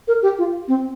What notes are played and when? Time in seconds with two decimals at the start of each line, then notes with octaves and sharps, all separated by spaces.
0.08 A#4
0.22 G4
0.39 F4
0.68 C4